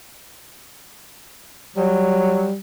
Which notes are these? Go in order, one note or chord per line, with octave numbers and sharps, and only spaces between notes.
F#3 G3